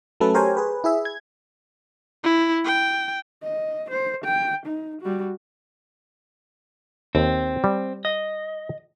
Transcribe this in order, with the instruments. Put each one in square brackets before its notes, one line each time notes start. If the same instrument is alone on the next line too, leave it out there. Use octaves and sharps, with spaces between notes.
[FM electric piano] F#3 A3 C#4 A4 B4
G4 A#4 C5 C#5 G#5
G#4 B4
E4 G#4 E5
G#6
[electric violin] E4
G5
[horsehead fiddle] D#5
C5
G5
D#4
G3 F#4
[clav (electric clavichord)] D#2 [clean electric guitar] C4
[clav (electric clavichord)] G3
[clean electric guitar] D#5